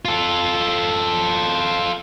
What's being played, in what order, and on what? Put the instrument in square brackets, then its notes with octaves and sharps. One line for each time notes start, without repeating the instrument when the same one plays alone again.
[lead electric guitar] F4 A4